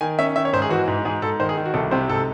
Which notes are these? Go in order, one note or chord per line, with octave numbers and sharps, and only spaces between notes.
D#3 G#5
C#4 E5
D#3 E5
C#5
G#2 C5
G#4
E3 F#4
G#2
G#2 G#4
G#2 A4
D#3 C5
G#4
D#3
F#4
C2 A4
C3 C5
G#2 A4